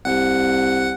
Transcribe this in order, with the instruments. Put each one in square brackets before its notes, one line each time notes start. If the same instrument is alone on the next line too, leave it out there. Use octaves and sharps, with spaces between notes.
[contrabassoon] C2 [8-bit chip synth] F#5